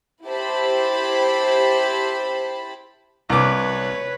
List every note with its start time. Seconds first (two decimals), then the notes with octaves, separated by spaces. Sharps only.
0.25 E4 G4 C5 A5 B5
3.30 C2 B4 C#5 D6